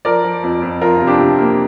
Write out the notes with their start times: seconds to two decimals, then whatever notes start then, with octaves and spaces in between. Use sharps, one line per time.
0.05 F3 A#4 D5
0.24 F3
0.43 F2
0.62 F2
0.81 F3 F4 A#4
0.97 C3 F4
1.07 D4 G4
1.20 C3
1.39 A#3